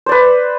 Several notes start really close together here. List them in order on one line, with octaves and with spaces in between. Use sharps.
C5 D5 B4